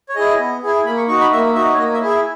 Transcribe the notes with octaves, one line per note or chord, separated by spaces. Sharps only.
C#5
E4 G#4 D#5
B3
E4 G#4
A#3 B5
C#6
D#4 F#4 C#6
B5
A#3 E5
D#4 F#4 E5
C#5
A#3 D#5
E5
E4 G#4
E5